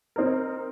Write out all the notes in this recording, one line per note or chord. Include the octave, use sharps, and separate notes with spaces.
C4 D#4 A#4